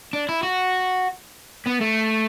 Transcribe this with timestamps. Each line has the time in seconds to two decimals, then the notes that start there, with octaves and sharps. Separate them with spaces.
0.13 D4
0.29 E4
0.43 F#4
1.66 B3
1.81 A3